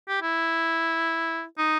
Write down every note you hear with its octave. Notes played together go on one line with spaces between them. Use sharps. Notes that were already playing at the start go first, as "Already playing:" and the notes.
G4
E4
D#4